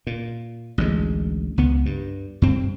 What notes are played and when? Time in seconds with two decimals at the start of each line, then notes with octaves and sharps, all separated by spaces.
0.07 A#2
0.78 A1 D2 G3 G#3
1.58 C#2 B3
1.86 G2
2.42 G2 C4